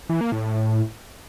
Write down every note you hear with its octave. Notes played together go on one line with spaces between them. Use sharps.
E3
A#3
A2